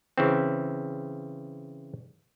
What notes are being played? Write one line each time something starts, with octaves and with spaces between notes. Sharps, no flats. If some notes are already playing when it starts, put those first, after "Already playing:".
C#3 E3 C4